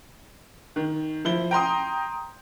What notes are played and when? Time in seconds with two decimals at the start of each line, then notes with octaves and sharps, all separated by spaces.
0.76 D#3
1.25 F3 E4 G7
1.51 G5 A#5 C6 D#6